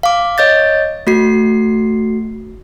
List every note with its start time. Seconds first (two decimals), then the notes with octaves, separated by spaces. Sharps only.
0.03 F5 D6
0.38 C#5 D#5 G6 A6
1.07 A3 F#4 C7